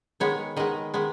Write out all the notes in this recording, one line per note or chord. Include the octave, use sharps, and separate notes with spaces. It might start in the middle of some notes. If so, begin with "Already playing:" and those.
D#3 G#3 B3 C#5
D#3 G#3 B3 D#5
D#3 G#3 B3